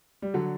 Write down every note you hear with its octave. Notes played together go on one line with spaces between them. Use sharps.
G3
D3 F#3